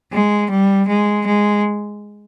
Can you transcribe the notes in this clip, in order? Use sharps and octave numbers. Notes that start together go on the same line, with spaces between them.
G#3
G3
G#3
G#3